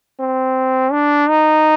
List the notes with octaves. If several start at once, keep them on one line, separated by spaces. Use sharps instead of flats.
C4
D4
D#4